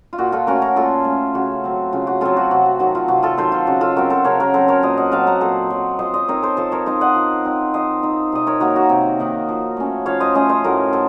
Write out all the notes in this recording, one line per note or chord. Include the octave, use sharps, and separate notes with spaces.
F4
A#2 F#4
F4 A4
A3 C#4 F#4 A#4
F#4 A#4
A#2 F4 A4
A3 C#4
C#3 F#4
F#3 C4
C#3 F4
F#4
F#3 C4 F4 A4
F#4
C3 F#4
F#4
D#3 F#3 F#4
F4
C3 F#4
F4 A4
D#3 F#3 A4 C5
F4
C#3 F#4
F4 A4
F#3 C4 F#4 A#4
A4 C5
C#3 A#4 C#5
F#4 A#4
F#3 C4 A4 C5
A#4 C#5
A#2 C5 D#5
D#5 F#5
F#3 C4 F5 A5
F#5 A#5
A#2 A4 C5
F#3 C4
F3 C5 D#5
C5 D#5
C4 D#4 A#4 C#5
A4 C5
F3 A4 C5
A#4 C#5
C4 D#4 C5 D#5
D#5 F#5
F3
C4 D#4
F3 C5 D#5
C4 D#4
C3 D#5
A#4 C#5
D#3 A#3 D#4 F#4 A#4
F#4 A#4
C3
D#3 A#3 D#4
F3
A3 C#4
F3 C#5 F5
C5 D#5
A3 C#4 C5 D#5
C5 D#5
A2 F#4 A#4
A4 C5